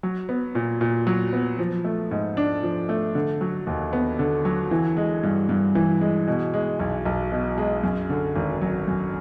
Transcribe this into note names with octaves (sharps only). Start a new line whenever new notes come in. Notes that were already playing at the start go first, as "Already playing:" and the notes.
F#3
B3
A#2
A#2
F#3
B3
F3
A3
G#2
D4
F3
A3
D3
F#3
D#2
B3
D3
F#3
E3
G#3
G2
G2
E3
G#3
B2
G#3
B1
B1
B2
G#3
F#2
D3
G#1
F#3
F#2